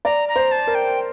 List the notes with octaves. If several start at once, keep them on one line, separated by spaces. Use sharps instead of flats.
D5 A#5
A#5
C5
A5
A#4
G5